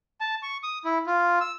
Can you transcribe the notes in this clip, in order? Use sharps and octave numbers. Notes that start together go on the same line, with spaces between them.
A5
C#6
D#6
E4
F4
E6